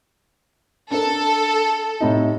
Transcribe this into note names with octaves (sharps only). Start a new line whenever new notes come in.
D4 A4 A#4
A2 C3 D#4